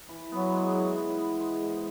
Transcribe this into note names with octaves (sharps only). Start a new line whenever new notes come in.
E3
F#3 B3
G#3
E3
E3
B3
G#3
G#2